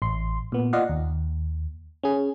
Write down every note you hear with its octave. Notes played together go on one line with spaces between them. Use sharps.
A1 C6
A#2 B3
F4 D5 D#5 F5 F#5
D#2
C#4 G#4